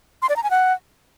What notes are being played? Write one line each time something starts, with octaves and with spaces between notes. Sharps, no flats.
C6
D5
A#5
G#5
F#5